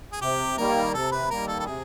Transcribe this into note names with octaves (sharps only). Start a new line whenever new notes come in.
G#4
C3 G4
D#3 G3 A#3 A#4
C3 A4
B4
D#3 G3 A#3 A#4
A4
A4
C3 G#4